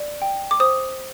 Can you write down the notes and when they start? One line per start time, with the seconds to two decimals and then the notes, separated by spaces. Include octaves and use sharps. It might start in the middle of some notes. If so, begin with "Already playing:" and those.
Already playing: D5
0.22 G5
0.51 D6
0.60 C5 D#6